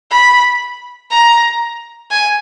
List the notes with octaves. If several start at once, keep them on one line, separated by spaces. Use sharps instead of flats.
B5
A#5
G#5